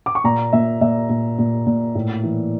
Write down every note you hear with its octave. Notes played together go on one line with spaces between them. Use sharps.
D6
C#6
A#2 A#5
A#2 E5
A#2 E5
A#2
A#2
A#2
A2
E3